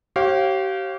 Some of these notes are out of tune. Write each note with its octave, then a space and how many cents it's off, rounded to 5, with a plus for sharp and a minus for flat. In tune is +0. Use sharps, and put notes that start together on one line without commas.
G4 -35 C#5 -45 F5 +0